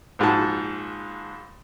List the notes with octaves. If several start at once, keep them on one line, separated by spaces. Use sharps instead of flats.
A#1 G#2 F#4 A5